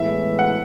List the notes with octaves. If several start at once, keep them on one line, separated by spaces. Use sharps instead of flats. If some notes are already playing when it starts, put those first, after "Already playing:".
Already playing: A2 E3 G#3 B3 E4 E5
F#5